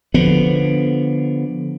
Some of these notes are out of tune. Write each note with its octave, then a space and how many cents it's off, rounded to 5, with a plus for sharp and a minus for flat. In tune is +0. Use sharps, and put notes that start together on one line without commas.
D3 +0 F3 +0 B3 +0